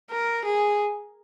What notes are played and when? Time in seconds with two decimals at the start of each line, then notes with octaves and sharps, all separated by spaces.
0.11 A#4
0.45 G#4